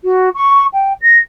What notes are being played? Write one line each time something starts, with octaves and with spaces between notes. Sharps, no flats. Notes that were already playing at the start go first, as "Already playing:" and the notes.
F#4
C#6
G5
A#6